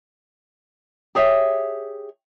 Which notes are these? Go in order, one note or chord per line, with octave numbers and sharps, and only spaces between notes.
G4 G#4 C#5 E5